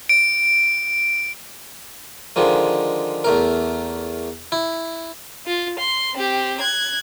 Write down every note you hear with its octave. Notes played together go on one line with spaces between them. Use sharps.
D7
D3 D#3 F3 G#3
E2 A3 A#4
E4
F4
C6
C4 G4
F#6 G#6